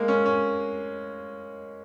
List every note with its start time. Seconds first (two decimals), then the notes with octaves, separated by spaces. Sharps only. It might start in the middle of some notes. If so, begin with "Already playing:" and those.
Already playing: G#3 A#3
0.08 C#4
0.26 C#4